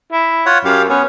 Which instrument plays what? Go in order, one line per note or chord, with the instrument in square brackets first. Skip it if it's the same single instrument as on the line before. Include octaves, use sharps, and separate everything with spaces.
[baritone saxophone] E4
[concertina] F4 C#5 F#5
[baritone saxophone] F#2 [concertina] G4 F5
[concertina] B3 [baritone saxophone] C#4